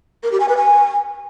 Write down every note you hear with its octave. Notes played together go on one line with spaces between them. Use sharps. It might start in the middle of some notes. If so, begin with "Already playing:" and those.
A#4
G4
G#5
B4
G#5